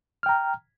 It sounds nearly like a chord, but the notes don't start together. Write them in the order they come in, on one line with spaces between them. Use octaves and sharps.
F6 G5 A#5